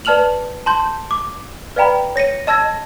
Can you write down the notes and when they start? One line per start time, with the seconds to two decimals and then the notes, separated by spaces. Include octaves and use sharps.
0.05 B4 D5 A5 F6 F7 F#7
0.66 A5 C6 G6
1.11 D6
1.76 B4 D5 F5 G5 A#5 B5
2.16 C#5 A#6 C#7 D#7
2.47 D#5 A5 E6 G#6 A#6